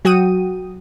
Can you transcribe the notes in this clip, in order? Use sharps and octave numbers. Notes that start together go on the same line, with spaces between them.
F#3 F#4 G5 D#6 D#7